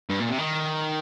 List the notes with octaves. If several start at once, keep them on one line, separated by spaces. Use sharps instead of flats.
G2
A#2
C3
D#3